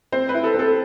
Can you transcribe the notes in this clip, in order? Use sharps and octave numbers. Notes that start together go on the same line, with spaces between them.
C4 C5
B4
E4
A4
C4 A4